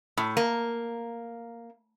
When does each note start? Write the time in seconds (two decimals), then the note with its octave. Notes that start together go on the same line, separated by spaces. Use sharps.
0.17 A2
0.37 A#3